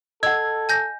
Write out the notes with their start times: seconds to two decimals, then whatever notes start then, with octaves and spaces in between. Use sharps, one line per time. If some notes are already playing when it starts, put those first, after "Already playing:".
0.23 A4 D#5 F#5 E6 G#6
0.69 G#5 G6 A#6